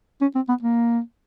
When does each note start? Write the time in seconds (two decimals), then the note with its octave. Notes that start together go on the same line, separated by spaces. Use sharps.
0.21 C#4
0.35 C4
0.49 B3
0.63 A#3